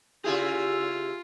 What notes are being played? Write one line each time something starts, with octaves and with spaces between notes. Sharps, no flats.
C#3 E4 F4 G4 G#4